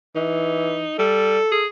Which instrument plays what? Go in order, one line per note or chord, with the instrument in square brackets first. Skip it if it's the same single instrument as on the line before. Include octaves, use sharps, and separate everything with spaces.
[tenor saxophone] E3 [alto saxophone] D#4
[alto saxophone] G3 [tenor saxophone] A4
[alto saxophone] G#4